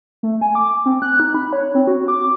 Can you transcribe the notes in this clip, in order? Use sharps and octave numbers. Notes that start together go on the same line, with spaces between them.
A3
G#5
D6
C4
F#6
D#4
B5
C#5
C4
F#4
D6